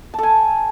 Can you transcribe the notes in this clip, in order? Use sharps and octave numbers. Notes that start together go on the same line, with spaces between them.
A4 G#5 A5